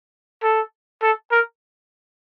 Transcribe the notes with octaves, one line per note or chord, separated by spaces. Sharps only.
A4
A4
A#4